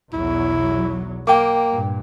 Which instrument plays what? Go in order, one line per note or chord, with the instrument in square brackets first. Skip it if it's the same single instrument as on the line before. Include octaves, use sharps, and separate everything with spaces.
[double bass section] B1 E2 F#3 [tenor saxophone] E4
[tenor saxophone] A#3 [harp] G5 D6
[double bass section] G2 A#2